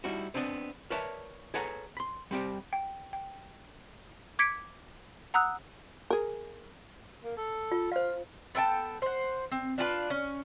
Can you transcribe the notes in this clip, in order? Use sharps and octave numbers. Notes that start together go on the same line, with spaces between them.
G3 D#4 E4 F#4
B3 C4 D4 C#5 D#5
A#4 B4 C#5 D5 E5 A5
G#4 A4 B4 C#5 F#5 A#5
B5 C6
G3 C4 G4 D5
G5
G5
D6 G#6 B6 C#7 D7
F#5 A#5 D#6 E6 F#6
G#4 A#4
A#3
A4
F4
F4 C5 F5
B3 A4 G5 A5
C5 F#5
C4
D4 F4 G4 B4
C#4